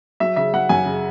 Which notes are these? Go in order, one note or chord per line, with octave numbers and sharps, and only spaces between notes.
F#3 E5
C#3 E5
F#3 F#5
F#2 G#5
C#3